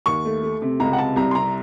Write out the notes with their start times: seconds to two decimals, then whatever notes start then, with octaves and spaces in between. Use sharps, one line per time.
0.06 D#2 C#6
0.25 A3
0.43 A3
0.62 C3
0.80 C#2 A#5
0.93 F#5
0.98 C3 A5
1.16 C2 A#5
1.31 C6
1.35 C3 A#5